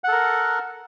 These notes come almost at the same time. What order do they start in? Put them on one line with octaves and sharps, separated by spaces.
F#5 A4 A#4